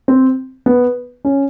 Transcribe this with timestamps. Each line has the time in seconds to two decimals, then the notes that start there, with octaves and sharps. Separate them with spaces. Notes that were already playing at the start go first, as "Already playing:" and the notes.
0.08 C4
0.66 B3
1.25 C#4